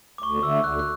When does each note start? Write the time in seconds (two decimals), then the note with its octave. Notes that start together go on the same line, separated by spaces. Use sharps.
0.18 D6
0.22 D2 C#6
0.43 D3 A3 E6
0.63 D2 F#6
0.79 F#6